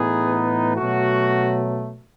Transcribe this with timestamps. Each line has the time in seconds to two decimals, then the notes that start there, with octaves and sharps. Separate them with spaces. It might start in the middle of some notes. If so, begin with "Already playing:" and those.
Already playing: A2 E3 B3 D#4 G#4
0.75 B2 F#3 A3 F#4